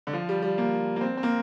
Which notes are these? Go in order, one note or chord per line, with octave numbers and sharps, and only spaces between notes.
D3
F3
G3
G3
A#3
A#3
C4
C4
A#3